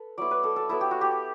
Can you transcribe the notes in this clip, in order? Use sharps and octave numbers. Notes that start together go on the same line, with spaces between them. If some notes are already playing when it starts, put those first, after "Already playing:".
Already playing: A4 B4
F#3 B3 E4 D5
B4
A4
A4
F#3 B3 E4 A4
G4
F#4
G4